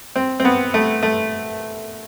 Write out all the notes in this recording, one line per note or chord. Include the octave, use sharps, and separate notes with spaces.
C4
C4
B3
A3
A3